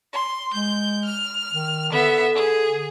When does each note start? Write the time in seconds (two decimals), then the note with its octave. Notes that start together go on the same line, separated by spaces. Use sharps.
0.13 C6
0.54 G#3 G6
1.05 F6
1.53 D#3
1.91 D3 B3 E5
2.35 G#4